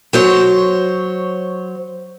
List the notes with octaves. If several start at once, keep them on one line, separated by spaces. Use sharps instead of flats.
F#3 C5 C#5